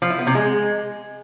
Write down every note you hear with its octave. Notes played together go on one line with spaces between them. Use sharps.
F3
E4
B3
C3
G#3